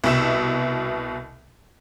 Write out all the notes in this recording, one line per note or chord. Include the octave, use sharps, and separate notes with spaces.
C2 B2 E5 E7